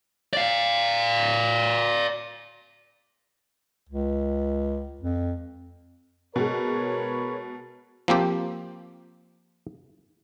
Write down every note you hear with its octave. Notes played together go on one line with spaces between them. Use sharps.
D5 F5
C#2
F2
B2 G#3 A#4 B4 C#5
F3 A#3 C4 G4